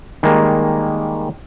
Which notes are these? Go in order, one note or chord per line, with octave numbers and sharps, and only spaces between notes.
D#3 G3 G#3 A#3